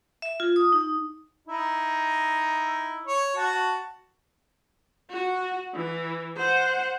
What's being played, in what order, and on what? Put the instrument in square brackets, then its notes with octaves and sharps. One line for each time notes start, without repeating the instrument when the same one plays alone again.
[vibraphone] E5
F4
D#6
D#4
[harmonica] D#4 E4
C#5
F#4 A5
[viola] F#4
E3
C5 F#5